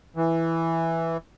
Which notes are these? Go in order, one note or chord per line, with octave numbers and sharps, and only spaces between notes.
E3